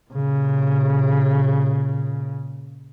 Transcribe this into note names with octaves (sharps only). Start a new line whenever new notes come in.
A#2 C#3